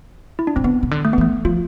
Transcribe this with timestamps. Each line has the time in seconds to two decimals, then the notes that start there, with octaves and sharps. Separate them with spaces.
0.39 E4
0.47 D4
0.56 C3 C4
0.64 D3 B3
0.83 C3
0.91 D3
1.05 A3
1.13 B3
1.18 E3
1.21 A3
1.45 F3 F4